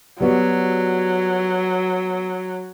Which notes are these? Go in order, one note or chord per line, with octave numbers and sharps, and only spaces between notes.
F#3 G3 B3 F#4